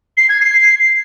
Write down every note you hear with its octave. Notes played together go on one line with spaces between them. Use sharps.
C7
G#6
C7